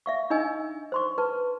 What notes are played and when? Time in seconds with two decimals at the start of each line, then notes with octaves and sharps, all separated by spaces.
0.06 E5 F5 C#6
0.30 D4 D#4 D#5 G#5 E6
0.92 C5 C6 C#6
1.18 B4 A5